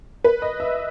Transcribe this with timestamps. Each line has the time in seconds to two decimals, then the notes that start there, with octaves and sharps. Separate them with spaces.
0.24 B4
0.42 D#5
0.60 E5